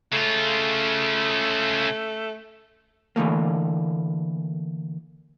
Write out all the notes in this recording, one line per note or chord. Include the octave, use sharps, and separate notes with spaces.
C#3 A3 F4
D3 E3 A3 A#3